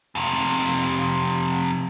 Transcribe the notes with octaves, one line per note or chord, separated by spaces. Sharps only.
F2 C3